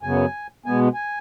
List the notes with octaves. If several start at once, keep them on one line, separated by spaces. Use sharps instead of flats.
F#2 C#3 F#3 B3 G#5
B2 G#3 B3 G#5
G#5